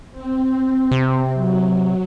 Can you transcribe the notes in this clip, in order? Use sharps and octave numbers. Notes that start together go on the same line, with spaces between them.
C4
C3
F#3